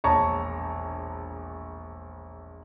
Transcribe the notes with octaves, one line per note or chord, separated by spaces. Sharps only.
E1 A#1 C#5 A5 A#5 C#6